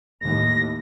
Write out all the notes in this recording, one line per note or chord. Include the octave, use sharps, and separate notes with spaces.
D#2 A2 A#6